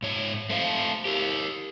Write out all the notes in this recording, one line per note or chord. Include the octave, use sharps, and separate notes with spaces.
G#2 C#5
A3 C5 F5
G4 A#4